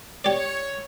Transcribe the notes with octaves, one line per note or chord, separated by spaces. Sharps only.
G4 C#5 D5